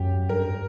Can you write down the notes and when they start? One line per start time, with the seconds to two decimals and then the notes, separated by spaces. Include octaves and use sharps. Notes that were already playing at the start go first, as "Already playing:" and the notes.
Already playing: F#2 G4
0.29 G2 A#4